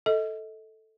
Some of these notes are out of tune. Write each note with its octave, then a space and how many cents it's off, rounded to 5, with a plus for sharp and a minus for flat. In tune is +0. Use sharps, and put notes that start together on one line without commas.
A4 +0 D#5 +30